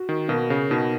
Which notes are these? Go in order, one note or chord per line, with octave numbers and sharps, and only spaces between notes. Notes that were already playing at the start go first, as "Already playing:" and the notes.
Already playing: F#4
D#3
B2 A#3
C#3
B2 D#4